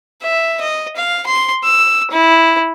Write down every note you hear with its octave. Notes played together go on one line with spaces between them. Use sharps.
E5
D#5
F5
C6
E6
E4